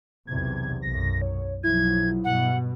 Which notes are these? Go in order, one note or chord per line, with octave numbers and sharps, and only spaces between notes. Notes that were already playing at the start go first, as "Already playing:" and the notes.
B1 E2 C3 G#6
B1 F#2 A#6
C#5
B1 F3 F#3 E4 G#6
G2 B2 F#5